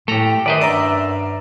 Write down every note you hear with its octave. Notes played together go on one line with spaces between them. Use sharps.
A2 A3 G4 A4 A#5
F#2 D#3 B4 C5 D5 D#5
G2 D5 E5 A#5 D6